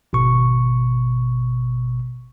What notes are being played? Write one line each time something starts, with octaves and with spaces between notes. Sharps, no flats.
G#1 B2 C#6